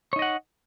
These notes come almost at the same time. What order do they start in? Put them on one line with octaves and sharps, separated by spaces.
C#5 D#4 D#5 F#5